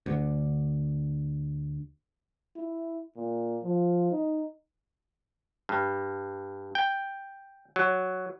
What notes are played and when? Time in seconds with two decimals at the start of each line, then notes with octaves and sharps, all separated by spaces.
0.06 D2 D3
2.56 E4
3.16 A#2
3.63 F3
4.11 D#4
5.69 G2
6.75 G5
7.76 F#3